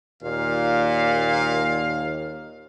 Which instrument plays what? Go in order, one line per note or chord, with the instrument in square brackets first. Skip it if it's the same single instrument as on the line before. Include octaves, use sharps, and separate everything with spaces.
[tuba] D#2 [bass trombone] A#2 [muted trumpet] F5